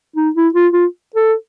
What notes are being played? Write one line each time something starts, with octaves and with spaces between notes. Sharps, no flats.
D#4
E4
F4
F4
A4